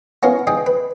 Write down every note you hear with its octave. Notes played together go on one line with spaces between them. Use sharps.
B3 C#4 E4 F4 A#4
D#4 G#4 D5 G5
B4